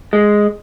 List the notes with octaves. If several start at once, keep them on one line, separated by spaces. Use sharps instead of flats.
G#3